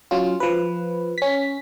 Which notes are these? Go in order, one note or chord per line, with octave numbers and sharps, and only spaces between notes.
F#3 C#4 F4
F3 B4
C#4 B6